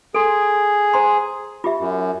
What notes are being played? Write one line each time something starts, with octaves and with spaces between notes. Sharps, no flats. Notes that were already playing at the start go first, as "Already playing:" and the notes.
G#4 A4 C6
C5 A#5 C6
F4 G4 E5
F#2